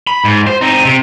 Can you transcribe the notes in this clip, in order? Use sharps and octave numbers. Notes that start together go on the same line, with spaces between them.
B5
G#2
C5
C4 D#4
C3